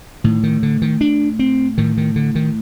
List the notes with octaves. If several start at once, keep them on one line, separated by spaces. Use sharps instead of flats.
A2 D#3
D#3
D3
D#3
D4
C4
A2 D#3
D#3
D3
D#3